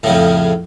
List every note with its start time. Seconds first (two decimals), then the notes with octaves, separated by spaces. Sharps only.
0.03 A2
0.06 C#3
0.09 F2